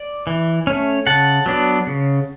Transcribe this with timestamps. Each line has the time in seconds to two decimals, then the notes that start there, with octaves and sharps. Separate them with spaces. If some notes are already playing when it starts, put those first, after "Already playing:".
Already playing: D5
0.27 E3
0.67 A3 C#4
1.06 C#3 F#5 A5
1.46 F#3 B3 D4
1.87 C#3